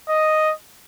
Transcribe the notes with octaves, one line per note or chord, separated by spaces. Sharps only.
D#5